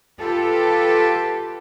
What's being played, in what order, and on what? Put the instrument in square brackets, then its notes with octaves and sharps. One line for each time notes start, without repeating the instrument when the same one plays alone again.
[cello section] F4 G4 A4 B4